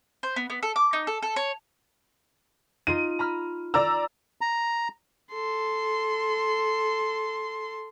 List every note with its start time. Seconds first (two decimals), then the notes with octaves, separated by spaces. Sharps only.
0.23 C5
0.36 B3
0.50 B3
0.63 A4
0.76 D6
0.93 D#4
1.07 A4
1.22 A4
1.36 C#5
2.87 D#4 F4 D#5 D#7
3.19 A#5 B5 F6
3.74 D5 A#5 E6
4.41 A#5
5.32 A4 C6